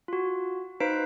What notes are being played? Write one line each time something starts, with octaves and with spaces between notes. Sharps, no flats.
F4 F#4
D#4 B4 C5 F5 B6 D7